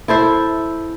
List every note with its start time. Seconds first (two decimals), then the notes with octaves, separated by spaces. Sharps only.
0.08 E4 A4 C5 E5